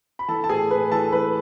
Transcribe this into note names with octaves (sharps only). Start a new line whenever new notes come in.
B5
E3 A4 A5
A5
A2 G#4 G#5
A2 B4 B5
E3 A4 A5
E3 B4 B5